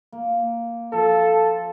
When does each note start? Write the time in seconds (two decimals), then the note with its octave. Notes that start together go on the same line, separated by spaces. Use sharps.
0.12 A#3
0.93 F3 A4